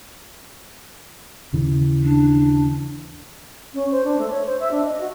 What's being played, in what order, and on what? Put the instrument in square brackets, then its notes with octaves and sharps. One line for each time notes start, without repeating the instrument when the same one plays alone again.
[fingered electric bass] D#2 C#3 E3
[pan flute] D4
[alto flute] C#4
C5
D4
A3
C#5
C5
E5
D4
D#5
F#4